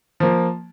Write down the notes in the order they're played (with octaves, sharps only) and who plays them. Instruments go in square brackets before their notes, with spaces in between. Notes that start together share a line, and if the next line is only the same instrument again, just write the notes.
[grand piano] F3 A#3